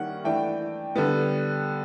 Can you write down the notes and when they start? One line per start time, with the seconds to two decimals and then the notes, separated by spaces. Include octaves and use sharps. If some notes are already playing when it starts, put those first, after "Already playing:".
Already playing: D#3 G3 A#3 C#4 E4 F#5
0.24 E3 A3 D4 G5
0.96 D3 G3 B3